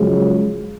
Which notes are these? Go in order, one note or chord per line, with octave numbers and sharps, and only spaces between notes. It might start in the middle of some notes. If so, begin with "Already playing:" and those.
Already playing: F#2 C#3 F3 G#3